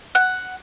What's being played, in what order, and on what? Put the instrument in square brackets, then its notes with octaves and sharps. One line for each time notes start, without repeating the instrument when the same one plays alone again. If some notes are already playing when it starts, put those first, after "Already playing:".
[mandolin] F#5